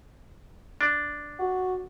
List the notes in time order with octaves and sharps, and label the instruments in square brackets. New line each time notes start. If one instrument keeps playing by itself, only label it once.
[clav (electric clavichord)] D4
[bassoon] F#4